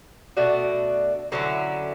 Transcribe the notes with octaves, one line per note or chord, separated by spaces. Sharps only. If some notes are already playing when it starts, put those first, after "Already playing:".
B2 A3 D4 F#4
D3 F#3 C#4 E4